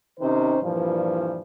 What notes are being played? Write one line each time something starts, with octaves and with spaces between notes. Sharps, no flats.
C3 D#3 C#4 D#4 C5
G2 A#2 E3 F3